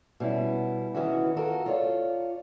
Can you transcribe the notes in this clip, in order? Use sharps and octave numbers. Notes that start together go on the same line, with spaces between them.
B2 G3 C#4 E4
D#3 E3 C#4 E4 F#4
F4 F#4 A4 A#4
F4 C#5 D5